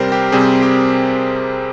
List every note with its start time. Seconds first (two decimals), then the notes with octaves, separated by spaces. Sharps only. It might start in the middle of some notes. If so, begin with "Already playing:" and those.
Already playing: C3 G3 C4 A#4 C5
0.12 G4
0.32 C3 G3 C4 G#4
0.62 G4